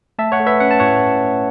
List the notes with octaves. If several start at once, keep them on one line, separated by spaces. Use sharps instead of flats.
A3 E5 A5
C#5 F#5
A3
B4 E5
C#4 F#5
A5
A2 C#5 F#5